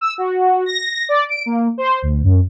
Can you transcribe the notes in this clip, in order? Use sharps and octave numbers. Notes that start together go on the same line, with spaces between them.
E6
F#4
A#6
D5
D7
A#3
C5
D2
F#2